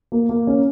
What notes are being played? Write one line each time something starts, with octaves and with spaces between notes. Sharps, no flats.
A#3
A#3
C#4